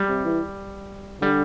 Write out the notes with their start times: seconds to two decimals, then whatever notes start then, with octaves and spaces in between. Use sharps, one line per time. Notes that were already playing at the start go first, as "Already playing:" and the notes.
Already playing: G3
0.09 C3
0.25 E3
1.22 D3 G3